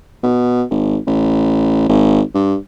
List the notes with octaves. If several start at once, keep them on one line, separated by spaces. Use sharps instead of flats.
B2
G#1
A1
G#1
G2